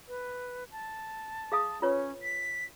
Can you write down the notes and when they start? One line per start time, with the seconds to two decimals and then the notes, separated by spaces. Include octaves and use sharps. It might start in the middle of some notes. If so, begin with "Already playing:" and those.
0.08 B4
0.72 A5
1.52 G#4 F5 D#6
1.82 C#4 F4 B4 C#5
2.23 B6